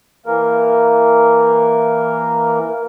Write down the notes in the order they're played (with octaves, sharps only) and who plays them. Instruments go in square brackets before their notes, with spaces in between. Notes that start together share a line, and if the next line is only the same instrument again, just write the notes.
[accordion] E3 A#3 A#4